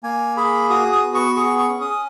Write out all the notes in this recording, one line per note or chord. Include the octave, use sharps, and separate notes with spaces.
A#3 G#5
G#4 B5
F#4 D#6
D#6
B3
C#6
G#4 C#6
C#6
C#4
D#6